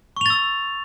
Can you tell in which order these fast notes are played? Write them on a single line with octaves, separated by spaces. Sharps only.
C#6 F7 A6 E6